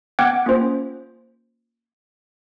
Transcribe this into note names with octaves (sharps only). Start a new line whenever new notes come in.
B3 F#5 G5 D6 F#6 G#6
A#3 C#4 F4 C5